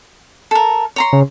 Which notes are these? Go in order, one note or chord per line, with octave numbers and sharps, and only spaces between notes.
A4 A#4
C#5 A#5 C6
C#3